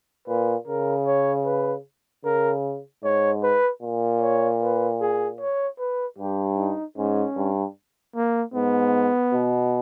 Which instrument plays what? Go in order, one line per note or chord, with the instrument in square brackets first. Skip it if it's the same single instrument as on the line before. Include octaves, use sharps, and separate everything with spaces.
[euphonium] A#2 [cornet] B4
[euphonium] C#3 [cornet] A#4
[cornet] C#5
B4
[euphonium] C#3 [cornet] A#4
[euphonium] G#2 [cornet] C#5
[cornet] B4
[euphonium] A#2
[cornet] C#5
B4
G#4
C#5
B4
[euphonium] G2 [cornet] G4
[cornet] D#4
[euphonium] G#2 [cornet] C#4
[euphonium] G2
[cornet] A#3
[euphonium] G#2 [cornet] B3
[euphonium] B2